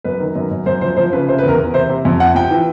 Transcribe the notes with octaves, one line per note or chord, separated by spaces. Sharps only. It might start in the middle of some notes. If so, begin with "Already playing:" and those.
F#2 B4
D#3
F#2
F#2
F#2 C5
F3 C5
F3 C5
C#3 B4
C3 C5
B4
E2 A#4
E2
C3 C5
C3
F2
C3 F#5
F3 G5
E3